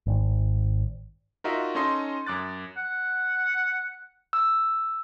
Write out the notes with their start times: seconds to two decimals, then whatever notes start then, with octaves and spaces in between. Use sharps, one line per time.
0.07 G#1
1.44 D#4 F4 F#4 A#4 D#5 E5
1.75 C#4 D#4 A4 D#5 C6
2.26 F#2 D6 F#6 A6
2.77 F#5
4.33 E6